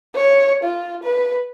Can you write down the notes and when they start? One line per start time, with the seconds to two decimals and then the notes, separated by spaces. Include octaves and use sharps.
0.15 C#5
0.63 F4
1.03 B4